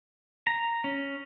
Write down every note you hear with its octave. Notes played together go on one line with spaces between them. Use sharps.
A#5
C#4